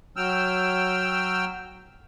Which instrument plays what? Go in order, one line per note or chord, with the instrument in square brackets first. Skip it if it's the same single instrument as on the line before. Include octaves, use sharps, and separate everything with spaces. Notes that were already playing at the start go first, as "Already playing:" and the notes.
[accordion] F#3 G5 E6 F6